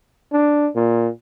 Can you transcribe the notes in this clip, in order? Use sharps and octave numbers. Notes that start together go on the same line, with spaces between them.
D4
A#2